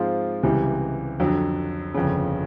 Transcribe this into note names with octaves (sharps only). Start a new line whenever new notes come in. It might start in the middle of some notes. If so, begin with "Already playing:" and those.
Already playing: G#2 F3 G#3 C4 F4
C#2 C3 E3 G3
F2 D3 F#3
G1 F2 C#3